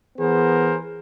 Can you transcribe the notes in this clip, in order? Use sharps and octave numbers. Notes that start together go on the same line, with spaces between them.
E3 B3 G#4 A#4 C5